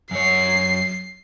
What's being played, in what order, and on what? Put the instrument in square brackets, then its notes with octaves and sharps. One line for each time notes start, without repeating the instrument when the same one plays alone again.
[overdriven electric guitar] F#2 C#5 [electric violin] C7